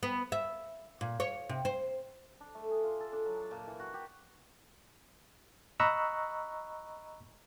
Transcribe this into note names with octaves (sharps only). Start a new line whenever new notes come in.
B3
E5
A#2
C#5
C3
C5
D4
A3
G#4
F4
A4
D4
F#3
A5
A#2
E3
F#4
G4
D#5 A#5 B5 C#6 E6 F#6